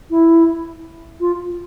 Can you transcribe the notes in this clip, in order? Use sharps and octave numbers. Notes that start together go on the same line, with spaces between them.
E4
F4